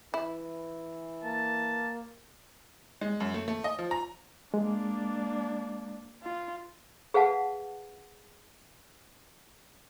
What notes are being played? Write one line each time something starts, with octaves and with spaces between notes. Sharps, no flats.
E3 E4
A#3 A5
G#3
F#2
A3
A3
D#5
F3
A#5
G#3 A#3 D4
F4
G#4 B4 F5 F#5 A5